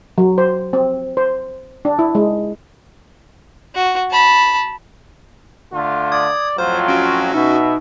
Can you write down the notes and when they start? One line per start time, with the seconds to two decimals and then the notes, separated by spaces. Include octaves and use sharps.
0.18 F#3
0.38 C5
0.73 C4
1.17 C5
1.85 D4
1.99 E4
2.15 G#3
3.75 F#4
4.11 A5 B5
5.73 D3 A3 F4
6.12 D5 D#6 G#6
6.58 F2 A2 F#3 F4 C5
6.88 C#4 F#4 D7
7.34 B2 D#4 E5